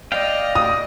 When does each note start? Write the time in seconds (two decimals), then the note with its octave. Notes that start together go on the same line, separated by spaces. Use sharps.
0.12 D5 D#5 F5 G5
0.55 D#6